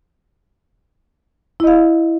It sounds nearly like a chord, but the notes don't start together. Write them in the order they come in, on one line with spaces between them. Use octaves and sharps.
E4 D#5 F5